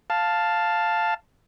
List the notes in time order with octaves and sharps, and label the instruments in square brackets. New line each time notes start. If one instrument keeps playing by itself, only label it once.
[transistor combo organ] F5 A5